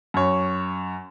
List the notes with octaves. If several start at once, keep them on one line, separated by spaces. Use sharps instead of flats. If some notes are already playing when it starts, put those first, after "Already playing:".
F#2 C#5